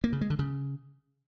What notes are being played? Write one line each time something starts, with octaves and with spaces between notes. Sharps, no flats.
A#3
C#3
G#3
D3
C#3